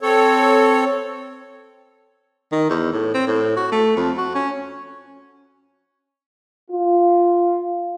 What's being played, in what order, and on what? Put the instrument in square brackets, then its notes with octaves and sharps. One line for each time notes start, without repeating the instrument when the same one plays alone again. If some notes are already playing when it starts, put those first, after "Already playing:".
[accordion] C4 A4 C#5
[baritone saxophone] D#3
E2
A2
C4
A2
F#4
A3
F2
F#4
C#4
[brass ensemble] F4